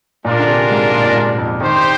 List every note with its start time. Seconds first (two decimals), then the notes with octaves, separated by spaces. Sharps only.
0.24 A#2 G#3 D4 F4 A#4 D5
0.39 D3
0.48 C3
0.71 G#2
0.92 A#2
1.05 A#2
1.15 G#2
1.38 F2
1.61 D#3 D#4 G4 C5